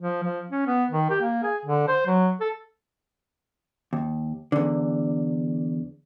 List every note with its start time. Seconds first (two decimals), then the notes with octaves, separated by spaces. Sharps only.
0.01 F3
0.23 F3
0.50 C#4
0.66 B3
0.90 D#3
1.10 G4
1.22 A#3
1.43 G#4
1.65 D3
1.88 C5
2.06 F#3
2.40 A4
3.93 D#2
4.52 E2 D3